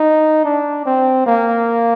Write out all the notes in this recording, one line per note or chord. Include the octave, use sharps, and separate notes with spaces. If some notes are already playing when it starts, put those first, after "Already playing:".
Already playing: D#4
D4
C4
A#3